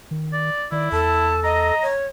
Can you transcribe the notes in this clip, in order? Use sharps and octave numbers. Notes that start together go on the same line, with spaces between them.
D#3
D5
D#3 E4 D5
E2 A4 A5
D#5 A#5
C#5